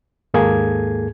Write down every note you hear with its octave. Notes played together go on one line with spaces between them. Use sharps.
D#2 G#2 A#3 G#4 A4 G#6